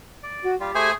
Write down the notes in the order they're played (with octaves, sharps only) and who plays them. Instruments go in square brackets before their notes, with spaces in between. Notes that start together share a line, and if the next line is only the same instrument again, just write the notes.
[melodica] D5
[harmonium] F#4
[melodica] G3 F4 [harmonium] G4
[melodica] A3 C5 G#5 [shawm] G#4